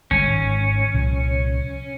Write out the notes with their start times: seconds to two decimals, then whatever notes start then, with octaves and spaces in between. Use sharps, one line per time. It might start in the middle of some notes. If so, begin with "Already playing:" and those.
0.11 G1 G#3 C#4
0.28 G#1 G#2 D#3
0.94 C2 A#2 F3